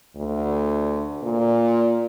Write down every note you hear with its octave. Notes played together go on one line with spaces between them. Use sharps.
D2
A#2